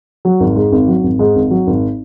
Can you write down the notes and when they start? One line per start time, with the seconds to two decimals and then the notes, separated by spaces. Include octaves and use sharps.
0.25 F#3
0.40 G#1
0.56 G#2
0.72 G#1
0.88 F#3
1.04 G#1
1.19 G#2
1.36 G#1
1.51 F#3
1.67 G#1